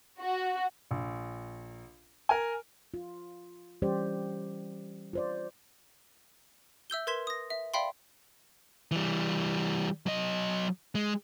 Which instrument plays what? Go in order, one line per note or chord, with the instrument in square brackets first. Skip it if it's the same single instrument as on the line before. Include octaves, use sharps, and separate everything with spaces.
[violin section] F#4
[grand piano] A#1
A#4 G#5
[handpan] F4
E3 G3 C#4 G4 C5 D5
F4 C5 D5
[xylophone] E5 E6 G6 G7
A#4 B4 C6 G#6 B6 E7
D#6 A#6
E5
D5 E5 F5 G5 B5 C6
[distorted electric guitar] E3 G3
F#3 D#5
G#3